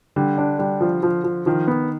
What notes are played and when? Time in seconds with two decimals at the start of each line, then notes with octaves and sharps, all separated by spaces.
0.16 D3 G3
0.38 D4
0.59 G3
0.81 F3
1.03 F3
1.24 F3
1.46 D#3 F3
1.68 B3